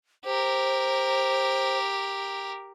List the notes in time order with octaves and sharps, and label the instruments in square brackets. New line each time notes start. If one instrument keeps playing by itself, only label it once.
[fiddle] G4 A#4 [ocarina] C5